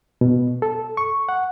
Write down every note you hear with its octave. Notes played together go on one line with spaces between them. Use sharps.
B2
A4
C#6
F#5